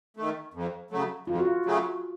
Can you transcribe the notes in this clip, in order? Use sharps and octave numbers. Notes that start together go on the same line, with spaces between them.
D#3 A3
F2
C#3 F#3 A3
F2 F4
F#4
F4
C#3 F#3 A3